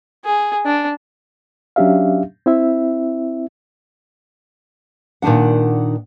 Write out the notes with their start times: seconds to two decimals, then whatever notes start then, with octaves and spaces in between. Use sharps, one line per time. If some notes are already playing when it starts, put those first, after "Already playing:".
0.25 G#4
0.65 D4
1.76 F#3 C#4 D4 G4 E5 F5
2.46 C4 E4 E5
5.22 A#2 D#3 G#3 D4 F#5